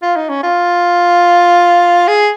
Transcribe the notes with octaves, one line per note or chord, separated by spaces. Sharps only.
F4
D#4
C#4
F4
G#4